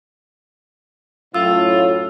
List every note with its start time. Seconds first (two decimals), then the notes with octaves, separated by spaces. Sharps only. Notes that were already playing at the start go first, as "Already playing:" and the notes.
1.34 F#2 A2 F4 E6